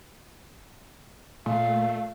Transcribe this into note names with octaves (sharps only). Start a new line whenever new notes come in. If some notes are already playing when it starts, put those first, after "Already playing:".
A#2 A3 F5